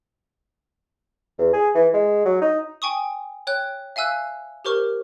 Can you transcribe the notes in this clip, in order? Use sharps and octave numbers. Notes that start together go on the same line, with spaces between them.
E2
G#4
E3
G#3
F#3
D#4
G5 G#5 C#6 D#6
C#5 G5 F#6
E5 F5 G#5 E6 F#6
G4 A#4 C5 C#6 F6